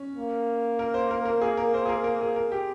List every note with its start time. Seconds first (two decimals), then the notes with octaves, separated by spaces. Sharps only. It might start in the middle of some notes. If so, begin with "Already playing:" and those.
Already playing: C#4
0.16 A#3
0.79 A#4
0.94 C5
1.11 A#4
1.25 A#4
1.41 G#4
1.57 A#4
1.74 C5
1.85 G#4
1.89 A#4
2.04 A#4
2.21 G#4
2.36 A#4
2.52 G4